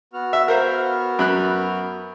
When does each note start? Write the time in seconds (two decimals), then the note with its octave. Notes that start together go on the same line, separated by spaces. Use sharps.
0.13 B3 F#4 F6
0.33 E5
0.48 A#4 C5 F5
1.19 F#2 B5 F#6